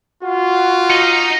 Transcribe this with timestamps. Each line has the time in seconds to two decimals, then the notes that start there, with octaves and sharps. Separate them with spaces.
0.23 F4 F#4
0.90 D#4 D#5